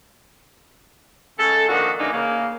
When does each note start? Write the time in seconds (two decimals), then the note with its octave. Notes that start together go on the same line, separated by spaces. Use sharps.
1.39 C#3 G#3 A4
1.69 A#2 D#3 F3 D4 F#4
1.98 C#3 E3 A#3 D4 D#4
2.13 C#3 A#3